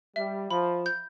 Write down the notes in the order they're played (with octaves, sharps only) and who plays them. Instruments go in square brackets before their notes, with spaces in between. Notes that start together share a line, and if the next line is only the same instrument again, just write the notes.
[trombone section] G3 [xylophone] E5
[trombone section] F3 [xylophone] B5
[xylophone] G6